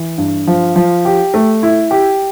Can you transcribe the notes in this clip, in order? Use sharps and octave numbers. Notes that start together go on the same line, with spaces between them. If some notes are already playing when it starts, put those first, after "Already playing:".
Already playing: E3
G2
F3
F3
G4
A3
E4
G4